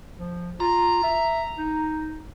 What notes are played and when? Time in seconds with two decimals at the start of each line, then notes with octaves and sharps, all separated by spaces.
0.17 F3
0.60 F4 A#5
1.03 E5
1.58 D#4